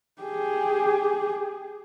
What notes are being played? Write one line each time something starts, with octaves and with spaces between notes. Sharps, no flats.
G4 G#4